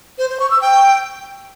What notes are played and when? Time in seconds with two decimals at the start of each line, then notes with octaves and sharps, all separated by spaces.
0.18 C5
0.29 C5
0.40 C#6
0.51 E6
0.61 G5